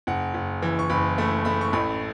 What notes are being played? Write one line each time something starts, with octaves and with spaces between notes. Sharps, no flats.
F#1 F#5
F#1
E3
C#6
F#1 B5
A3 B5
A3 B5
C#6
A1 B5